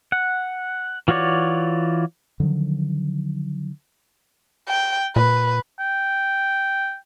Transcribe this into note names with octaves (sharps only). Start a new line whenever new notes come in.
F#5
E3 F4 F#4 C#5 D5
D3 D#3 F3 F#3
G5
A#2 B4
G5